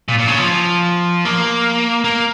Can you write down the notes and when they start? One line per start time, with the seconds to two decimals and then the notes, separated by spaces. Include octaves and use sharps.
0.08 A#2
0.19 A#2
0.27 C#3
0.38 F3
1.25 A#3
2.04 A#3